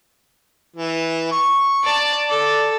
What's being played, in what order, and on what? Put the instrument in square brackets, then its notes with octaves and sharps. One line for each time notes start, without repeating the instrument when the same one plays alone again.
[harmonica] E3
C#6
[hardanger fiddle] D5 A5
[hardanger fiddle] A4 [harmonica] D5